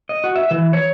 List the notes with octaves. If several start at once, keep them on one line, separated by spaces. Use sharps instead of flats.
D#5
F#4
E5
E3
C#5